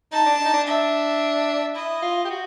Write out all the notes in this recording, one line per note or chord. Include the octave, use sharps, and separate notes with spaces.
D#4 A5
D4
D#4
D4
E5
E4 D#5
F4
G4
F#4